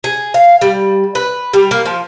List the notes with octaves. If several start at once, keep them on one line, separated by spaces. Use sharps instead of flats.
G#4
F5
G3
B4
G3
A#3
F3